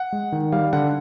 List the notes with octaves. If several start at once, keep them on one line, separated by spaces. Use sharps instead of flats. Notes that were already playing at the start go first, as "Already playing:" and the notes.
Already playing: F#5
G#3
D#3
G3 F5
D3 F#5